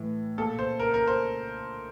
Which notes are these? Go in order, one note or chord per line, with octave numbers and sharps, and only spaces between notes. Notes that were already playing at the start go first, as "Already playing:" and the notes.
Already playing: A2 E3
A#2 A4
C5
A#4
A#4
C5